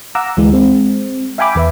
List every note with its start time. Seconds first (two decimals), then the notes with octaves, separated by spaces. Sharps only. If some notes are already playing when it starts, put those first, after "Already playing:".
0.15 F5 F#5 A#5 D6 E6
0.37 D2 E3 G#3
0.53 G#3 C4
1.38 E5 F5 G5 G#5 B5 D6
1.55 E2 B4 E5